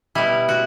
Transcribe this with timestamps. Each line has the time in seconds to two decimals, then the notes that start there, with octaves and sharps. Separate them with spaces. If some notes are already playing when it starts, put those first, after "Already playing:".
0.15 B2 G3 E4
0.49 F#4